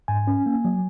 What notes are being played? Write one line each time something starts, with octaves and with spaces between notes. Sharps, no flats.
G#2 G#5
C#4
A#3
F#3